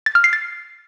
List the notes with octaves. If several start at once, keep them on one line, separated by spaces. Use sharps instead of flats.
A6
F6
C7
A6